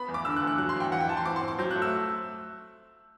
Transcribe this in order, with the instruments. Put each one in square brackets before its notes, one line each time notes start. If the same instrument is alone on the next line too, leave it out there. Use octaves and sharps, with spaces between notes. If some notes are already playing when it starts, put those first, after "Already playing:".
Already playing: [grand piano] B3 B5
E2
D6
D3 E6
F#6
E2
F#6
F#3 F#6
C6
E2 G5
E3 F#5
G5
E3 A5
C6
C4 D6
C6
C4
D6
F#3 G6
A3 F#6
E6